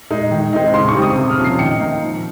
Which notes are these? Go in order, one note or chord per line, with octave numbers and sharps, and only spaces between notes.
G#3 D#4
D#3
G#3 C4 D#4
C#3 C6
C#6
G3 C4
D#6
C3 D#6
F6
F3 A#3 C#4
C7
D#3 C#7
A#3 D#4
F3